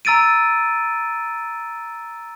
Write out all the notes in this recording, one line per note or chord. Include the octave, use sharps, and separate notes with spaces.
A#5 E6 A6 D7 D#7